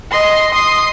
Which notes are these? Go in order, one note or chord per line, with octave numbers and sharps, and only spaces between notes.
D#5 C6
C6 D#6